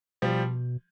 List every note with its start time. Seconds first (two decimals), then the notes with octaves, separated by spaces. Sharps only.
0.22 B2 F3 G3